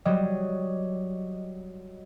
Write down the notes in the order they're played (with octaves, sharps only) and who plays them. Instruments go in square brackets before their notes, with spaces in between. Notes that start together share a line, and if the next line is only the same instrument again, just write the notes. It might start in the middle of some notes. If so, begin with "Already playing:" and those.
[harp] F#3 G3 D#5